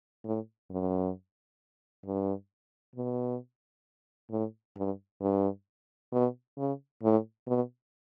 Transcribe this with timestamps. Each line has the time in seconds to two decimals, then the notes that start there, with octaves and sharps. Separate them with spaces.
0.24 A2
0.70 F#2
2.06 G2
2.96 B2
4.31 A2
4.77 G2
5.21 G2
6.12 B2
6.58 C#3
7.03 A2
7.47 B2